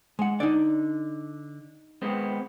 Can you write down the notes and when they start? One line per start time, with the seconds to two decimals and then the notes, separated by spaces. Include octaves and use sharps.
0.19 G#3 F#5
0.40 D3 D#4 D5
2.02 G#3 B3 C4